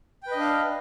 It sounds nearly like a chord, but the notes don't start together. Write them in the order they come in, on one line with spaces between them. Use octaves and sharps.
G5 B4 D#5 D4 F5